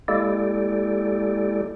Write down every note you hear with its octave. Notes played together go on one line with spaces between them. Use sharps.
G#3 A#3 E4 G4 A4 D5